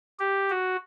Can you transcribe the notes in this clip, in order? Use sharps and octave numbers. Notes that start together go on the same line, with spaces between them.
G4
F#4